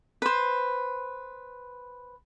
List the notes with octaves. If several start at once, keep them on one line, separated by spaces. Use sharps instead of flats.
B4 C5